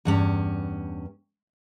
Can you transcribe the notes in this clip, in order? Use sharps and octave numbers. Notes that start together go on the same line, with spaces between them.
E2 G2 C#4